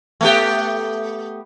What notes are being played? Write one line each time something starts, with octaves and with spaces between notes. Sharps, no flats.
A3 B3 G4